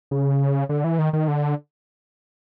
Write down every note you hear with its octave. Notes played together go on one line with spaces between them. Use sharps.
C#3
D3
E3
D#3
D#3
D3